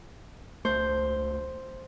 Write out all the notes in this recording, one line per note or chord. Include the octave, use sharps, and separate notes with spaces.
C#2 A3 C5